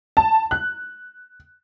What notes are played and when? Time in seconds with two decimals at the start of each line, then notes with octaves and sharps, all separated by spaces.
0.17 A5
0.51 F#6